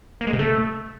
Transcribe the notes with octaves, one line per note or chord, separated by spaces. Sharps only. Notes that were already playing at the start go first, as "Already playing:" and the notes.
A#3
G#3
C3
A3